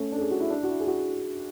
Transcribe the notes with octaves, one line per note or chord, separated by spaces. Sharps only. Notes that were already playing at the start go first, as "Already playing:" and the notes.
Already playing: A3 C#4
D4 A4
G#4
F#4
E4
D4
F#4
E4
G#4
F#4